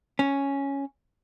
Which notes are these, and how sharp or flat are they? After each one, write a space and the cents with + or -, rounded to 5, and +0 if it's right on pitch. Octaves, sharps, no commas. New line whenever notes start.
C#4 +0